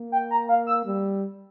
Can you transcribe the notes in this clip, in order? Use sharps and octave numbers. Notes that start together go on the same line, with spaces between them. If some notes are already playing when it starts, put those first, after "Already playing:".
Already playing: A#3
G5
A#5
F5
E6
G3